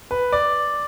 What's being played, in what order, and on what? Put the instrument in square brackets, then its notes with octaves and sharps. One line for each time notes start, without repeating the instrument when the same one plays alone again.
[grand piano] B4
D5